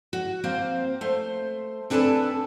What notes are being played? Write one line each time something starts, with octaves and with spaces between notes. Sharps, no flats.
F#4
A#3 C4 C5 F5
A3 C5
C4 D4 A4 B4 G#5 A5